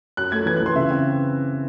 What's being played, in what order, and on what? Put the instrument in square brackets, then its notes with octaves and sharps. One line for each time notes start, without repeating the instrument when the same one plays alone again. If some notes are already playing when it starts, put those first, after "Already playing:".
[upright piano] F#2 F#6
A3 G#6
E3 G#6
F#6
E3 C6
C#3 E5
C4